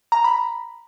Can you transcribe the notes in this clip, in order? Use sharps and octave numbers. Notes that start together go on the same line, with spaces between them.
A#5
B5